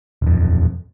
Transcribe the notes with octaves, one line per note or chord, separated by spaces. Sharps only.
D#1 F2